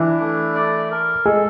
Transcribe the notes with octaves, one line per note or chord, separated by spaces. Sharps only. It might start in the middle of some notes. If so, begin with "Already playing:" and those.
Already playing: E3 D4 E4
A3
D5
A#4
G#3 G#4 A4